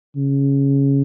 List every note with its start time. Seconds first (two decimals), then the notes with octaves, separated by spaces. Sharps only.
0.16 C#3